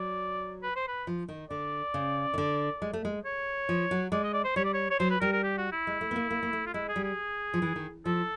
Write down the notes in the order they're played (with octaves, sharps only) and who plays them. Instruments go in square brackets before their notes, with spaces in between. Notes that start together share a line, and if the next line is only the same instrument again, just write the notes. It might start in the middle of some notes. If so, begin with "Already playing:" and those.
Already playing: [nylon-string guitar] F#3 [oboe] D5
[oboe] B4
C5
B4
[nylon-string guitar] F3
D#3
[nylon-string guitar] D3 [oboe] D5
[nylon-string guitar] C#3
D#3
D3
G#3
A3
G#3
[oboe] C#5
[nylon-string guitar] F3
F#3
[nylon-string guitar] G#3 [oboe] D5
[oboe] D#5
D5
C5
[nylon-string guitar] G3 [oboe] C#5
[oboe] D5
C#5
C#5
[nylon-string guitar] F#3 [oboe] C5
[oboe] B4
[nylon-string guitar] G3 [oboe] A#4
[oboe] A#4
G4
F#4
E4
[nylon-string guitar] G#3
A3
B3
A#3
A#3
A#3
A3
[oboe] F4
[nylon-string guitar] G#3 [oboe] E4
[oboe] G#4
[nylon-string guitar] G3
[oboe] G#4
[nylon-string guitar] F3
E3
D#3
[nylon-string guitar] F3 [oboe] A4